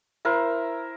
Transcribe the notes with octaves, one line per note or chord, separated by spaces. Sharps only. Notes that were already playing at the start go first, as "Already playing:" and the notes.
E4 A#4 C5